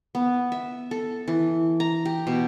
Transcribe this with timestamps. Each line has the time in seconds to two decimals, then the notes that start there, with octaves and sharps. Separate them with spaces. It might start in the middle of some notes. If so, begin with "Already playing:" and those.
0.15 B3
0.52 E5
0.91 A4
1.28 E3
1.80 A#5
2.05 G4
2.27 B2